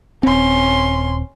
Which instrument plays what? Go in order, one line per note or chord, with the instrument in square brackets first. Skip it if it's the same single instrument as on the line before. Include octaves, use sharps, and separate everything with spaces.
[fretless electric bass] D#1 C4 [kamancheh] C#4 C6